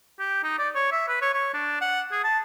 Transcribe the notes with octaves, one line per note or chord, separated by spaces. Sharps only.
G4
D#4
D5
C#5
E5
B4
C#5
C#5
D4
F#5
G#4
A5